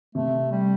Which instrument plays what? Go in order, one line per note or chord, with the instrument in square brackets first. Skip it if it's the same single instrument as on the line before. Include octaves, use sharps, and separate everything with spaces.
[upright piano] C3 [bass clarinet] A3
[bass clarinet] G3